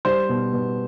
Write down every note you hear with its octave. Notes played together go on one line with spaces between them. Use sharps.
G3 C5
B2
B2